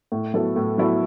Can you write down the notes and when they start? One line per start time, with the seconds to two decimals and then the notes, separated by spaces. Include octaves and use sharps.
0.12 A2
0.34 F#3 B3 E4 A4
0.56 A2
0.78 F#3 B3 E4 A4